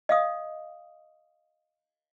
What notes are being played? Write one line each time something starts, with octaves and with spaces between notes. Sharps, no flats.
D#5 F5 D#6